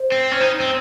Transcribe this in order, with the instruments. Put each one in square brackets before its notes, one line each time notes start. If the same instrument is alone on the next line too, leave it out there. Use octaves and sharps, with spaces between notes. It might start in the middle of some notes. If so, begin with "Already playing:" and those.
Already playing: [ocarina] C5
[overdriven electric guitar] C4
C#4
D#4
C4